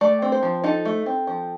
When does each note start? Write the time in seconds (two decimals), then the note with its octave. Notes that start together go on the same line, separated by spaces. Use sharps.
0.01 A3 D5
0.22 C4
0.32 C5
0.43 F3
0.64 D#4 A4
0.85 A3
1.06 C4
1.27 F3